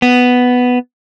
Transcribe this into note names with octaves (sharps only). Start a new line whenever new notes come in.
B3